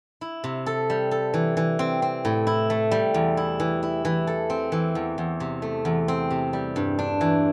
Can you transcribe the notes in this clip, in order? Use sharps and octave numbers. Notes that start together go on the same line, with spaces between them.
E4
C3
A4
G3
A4
E3
E3
C4
C4
A2
E4
A3
G3
E2
E4
E3
E4
E3
A4
C4
E3
E2
E2
C3
A3
E2
C4
C3
G3
G2
D4
E3